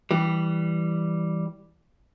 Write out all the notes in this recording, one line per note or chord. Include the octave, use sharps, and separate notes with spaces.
E3 G3